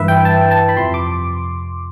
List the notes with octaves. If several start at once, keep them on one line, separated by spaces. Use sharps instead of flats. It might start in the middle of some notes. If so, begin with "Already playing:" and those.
Already playing: G2 E3 B4 E5
G5
A5
A5
B5
F2 C3 F3 C6
D6